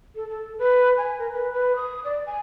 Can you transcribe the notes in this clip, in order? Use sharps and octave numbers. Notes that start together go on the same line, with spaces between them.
A4
A4
B4
G#5
A#4
B4
B4
D#6
D5
G#5